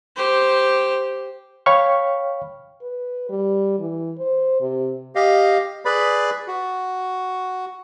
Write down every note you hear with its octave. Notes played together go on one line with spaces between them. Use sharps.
G4 C5
C#5 F5 G5 B5 C#6 F6
B4
G3
E3
C5
C3
G4 D#5 F5
G#4 B4 D5 B5
F#4